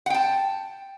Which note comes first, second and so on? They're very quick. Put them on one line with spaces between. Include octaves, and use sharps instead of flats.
F#5 G5 A5